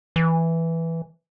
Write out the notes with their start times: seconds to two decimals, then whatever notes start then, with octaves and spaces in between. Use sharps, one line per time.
0.16 E3